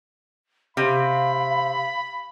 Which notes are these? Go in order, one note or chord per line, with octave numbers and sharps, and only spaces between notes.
C3 F5 B5